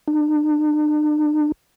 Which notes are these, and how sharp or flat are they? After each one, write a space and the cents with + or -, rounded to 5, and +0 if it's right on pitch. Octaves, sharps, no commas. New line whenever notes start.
D4 +45